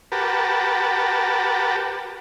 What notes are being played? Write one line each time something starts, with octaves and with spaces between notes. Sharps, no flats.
F#4 G4 A#4 B4 A5